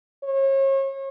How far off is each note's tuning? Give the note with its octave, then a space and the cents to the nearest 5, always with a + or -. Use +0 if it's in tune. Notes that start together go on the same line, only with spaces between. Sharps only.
C#5 -35